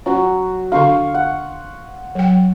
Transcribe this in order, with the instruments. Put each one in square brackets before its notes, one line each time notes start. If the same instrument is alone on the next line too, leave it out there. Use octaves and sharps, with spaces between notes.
[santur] F#3 F#4 [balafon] C#4
[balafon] D3 D4 [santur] F5 C6 C#6
[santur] F#5
[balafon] F#3 G5